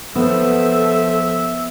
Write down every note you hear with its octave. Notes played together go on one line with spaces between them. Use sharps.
F3 B3 A4 E5 E7